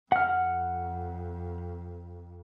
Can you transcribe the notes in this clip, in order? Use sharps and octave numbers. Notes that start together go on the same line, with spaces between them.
F2 F#5 F6